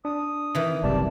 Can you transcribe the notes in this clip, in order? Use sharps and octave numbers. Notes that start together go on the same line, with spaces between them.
D4 D#6
D#3 E3
F#1 C2 C3 G3 D5 A5